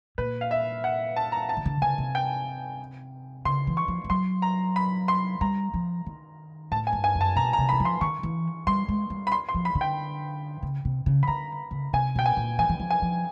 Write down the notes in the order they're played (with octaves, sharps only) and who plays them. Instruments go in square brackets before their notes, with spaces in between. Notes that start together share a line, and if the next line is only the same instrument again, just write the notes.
[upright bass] A#2 [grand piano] B4
[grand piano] F5
E5
F#5
A5
A#5
A5
[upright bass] D#3
D3
[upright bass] C#3 [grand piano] G#5
[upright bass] C3
[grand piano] G5
[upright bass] C#3 [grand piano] C6
[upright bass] E3
[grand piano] C#6
[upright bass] F3
F3
[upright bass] F#3 [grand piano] C6
[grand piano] A#5
B5
C6
[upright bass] G3 [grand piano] A#5
[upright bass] F3
D#3
[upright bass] A2 [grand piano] A5
[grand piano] G#5
[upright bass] G2
[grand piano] G#5
[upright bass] F#2
[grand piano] A5
[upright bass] B2 [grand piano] A#5
[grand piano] A#5
[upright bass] C3
[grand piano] B5
[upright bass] E3
F3
[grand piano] C6
[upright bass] D#3 [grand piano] C#6
[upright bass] E3
[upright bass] G3 [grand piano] C6
[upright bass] G#3
G3
[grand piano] B5
C6
C6
[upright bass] F3
[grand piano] B5
[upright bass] D3
[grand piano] G5
[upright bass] C#3
C3
C#3
[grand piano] B5
[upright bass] D3 [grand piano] A#5
[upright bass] C#3
[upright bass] C3 [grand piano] G#5
[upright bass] B2 [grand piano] G5
[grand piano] G#5
[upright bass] A#2
[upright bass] E3 [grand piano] G#5
[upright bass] E3
F3
[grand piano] G#5
[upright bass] F3